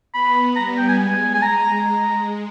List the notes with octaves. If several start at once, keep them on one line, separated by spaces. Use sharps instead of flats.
B3 B5
G3 A#5
G5
G#5
G#3 G#5
G#5
A#5